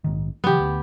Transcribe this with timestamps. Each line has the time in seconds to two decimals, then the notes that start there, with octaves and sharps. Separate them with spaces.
0.04 A#1 G#2 D#3
0.44 C#3 E3 F#3 B3 G4
0.59 D2